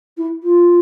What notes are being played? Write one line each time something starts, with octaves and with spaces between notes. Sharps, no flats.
E4
F4